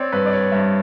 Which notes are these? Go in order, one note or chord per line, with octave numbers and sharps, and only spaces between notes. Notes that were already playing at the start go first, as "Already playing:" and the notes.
Already playing: C4 C#5 D5
G2 B4
D5
C#5
G2 E5